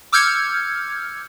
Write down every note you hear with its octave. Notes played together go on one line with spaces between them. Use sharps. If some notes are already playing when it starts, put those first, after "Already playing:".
D6 E6 F6 G6 G#6 C#7